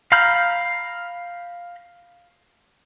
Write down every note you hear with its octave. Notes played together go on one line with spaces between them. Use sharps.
F5 A#5 B5 F6 G6